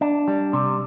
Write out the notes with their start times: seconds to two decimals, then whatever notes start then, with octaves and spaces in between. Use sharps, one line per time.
0.01 D4
0.28 G3
0.53 C3